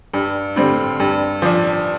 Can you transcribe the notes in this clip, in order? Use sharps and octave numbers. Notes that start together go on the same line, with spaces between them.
G2
D3 G3 C4
G2
F3 D4